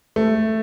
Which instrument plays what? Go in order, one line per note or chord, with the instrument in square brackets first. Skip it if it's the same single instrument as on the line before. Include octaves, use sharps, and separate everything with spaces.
[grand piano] A3